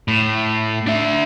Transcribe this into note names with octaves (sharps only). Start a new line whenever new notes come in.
A2
D4 E5